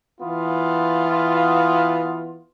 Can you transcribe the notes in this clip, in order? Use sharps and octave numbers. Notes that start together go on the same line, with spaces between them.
E3 B3 F4